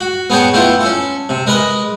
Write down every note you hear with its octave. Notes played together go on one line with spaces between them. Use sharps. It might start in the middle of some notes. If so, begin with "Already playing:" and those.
F#4
B3 G#4 C#5 G5 A5
A3 B3 E4 F4 G4
C#4 A4
C3
G#3 A#4 B4 D#5